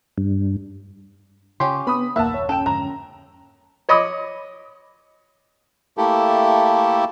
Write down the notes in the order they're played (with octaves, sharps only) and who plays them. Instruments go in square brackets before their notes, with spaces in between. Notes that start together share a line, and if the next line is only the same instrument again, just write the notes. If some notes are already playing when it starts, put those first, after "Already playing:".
[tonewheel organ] G2
[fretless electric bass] C#3 [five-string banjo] C#4 F4 G4 [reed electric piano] C6
[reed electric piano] B3 [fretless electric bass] C4 D4 [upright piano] B5 D#6
[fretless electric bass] F#1 D#2 A#2 [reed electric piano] A#3 [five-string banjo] B4 F#5 [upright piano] E5 A5
[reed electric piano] C#5
[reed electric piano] C#4 [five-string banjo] A4 [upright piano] G5 E7
[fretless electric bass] F2 G#2 D3 [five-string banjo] A#4 [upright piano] A#5
[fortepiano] C#5 D#5 B5 D6 D#6
[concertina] A3 A#3 E4 G4 A4